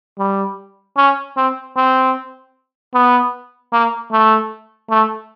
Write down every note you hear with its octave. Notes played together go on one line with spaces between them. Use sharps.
G3
C#4
C4
C4
B3
A#3
A3
A3